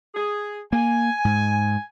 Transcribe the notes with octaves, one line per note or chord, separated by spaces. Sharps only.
G#4
A#3 G#5
G#2